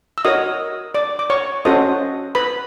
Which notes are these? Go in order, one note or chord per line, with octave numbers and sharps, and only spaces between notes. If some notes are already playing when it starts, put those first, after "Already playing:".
E6
F#4 A#4 C#5 D#5 D#6
D5 D6
D6
C#5 C#6
C#4 F#4 A4 C5 D#5 D#6
B4 B5